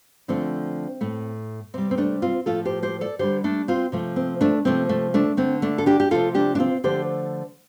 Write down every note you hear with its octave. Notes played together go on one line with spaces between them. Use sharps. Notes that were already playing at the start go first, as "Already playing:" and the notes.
D3 F3 A3 C4
A2 A3
C3 G3 C4
C4
A3 D4
C4 F4
A2 F3 A3 F4 A4
G4 C5
G4 C5
A4 D5
D3 G3 G4 C5
A3 D4
C4 F4
C3 F3 A3
C4
A3 D4
C3 F3 A3 C4
A3
A3 D4
D3 A3 C4
A3 D4
A4
D4 G4
G4
C3 F3 A3 F4 A4
D4 G4
D4
C4 F4
D3 F3 A3 G4 C5